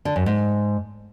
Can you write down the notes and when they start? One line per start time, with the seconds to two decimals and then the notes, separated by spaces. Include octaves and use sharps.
0.05 D3
0.16 F#2
0.26 G#2